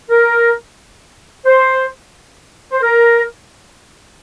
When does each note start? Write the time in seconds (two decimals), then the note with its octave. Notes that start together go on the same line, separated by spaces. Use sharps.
0.10 A#4
1.45 C5
2.72 C5
2.82 A#4